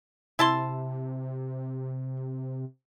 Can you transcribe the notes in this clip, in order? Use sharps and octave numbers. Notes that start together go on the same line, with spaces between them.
C3 E4 A5 C6